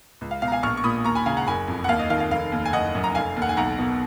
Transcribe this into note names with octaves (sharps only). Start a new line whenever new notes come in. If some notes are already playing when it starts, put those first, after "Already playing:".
C#2
F5
B2 F5
A#5
F5 G#5
A#1 C#6 F6
C#6
A#2 B5 D#6
D#2 A#5 C#6
G#5 B5
C#3 F5 G#5
F#5 A#5
F#1 G#5 B5
F2
F#5
D#2 F5
D#5
D#3 F5
F5
F1 F5
D#2
G#5
F#1 D#5 F#5
F#2
A#5
F1 F5 G#5
D#2
F#5
G#5
B1 F#5 A#5
B2